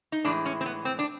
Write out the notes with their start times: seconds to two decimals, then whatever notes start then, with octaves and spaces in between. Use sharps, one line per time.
0.12 D#4
0.25 A2 E3 G#3 D4
0.46 C#4
0.61 C4
0.66 B3
0.85 C4
0.99 D4